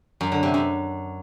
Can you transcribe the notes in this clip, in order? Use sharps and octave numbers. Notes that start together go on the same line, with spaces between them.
F#2
D3
C3
F#2